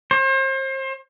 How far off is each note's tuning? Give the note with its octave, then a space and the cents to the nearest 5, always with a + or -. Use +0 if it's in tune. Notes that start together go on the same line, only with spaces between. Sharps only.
C5 +35